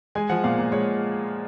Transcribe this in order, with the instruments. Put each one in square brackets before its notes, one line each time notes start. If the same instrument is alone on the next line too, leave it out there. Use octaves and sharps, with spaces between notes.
[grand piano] G#3 G#5
F3 F#5
A#2 F5
A#2
G#3 C#5